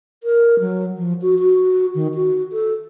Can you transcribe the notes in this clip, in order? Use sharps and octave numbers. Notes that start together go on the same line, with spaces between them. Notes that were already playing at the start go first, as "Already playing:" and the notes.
A#4
F#3
F3
F#4
F#4
D#3
F#4
A4